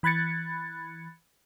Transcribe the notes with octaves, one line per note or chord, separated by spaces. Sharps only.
E3 B5 F#6 G#6 A6 C#7